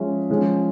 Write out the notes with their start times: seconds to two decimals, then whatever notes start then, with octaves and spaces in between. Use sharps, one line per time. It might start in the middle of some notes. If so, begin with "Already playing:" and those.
Already playing: F3 G#3 C#4 E5
0.29 F3 G#3 C#4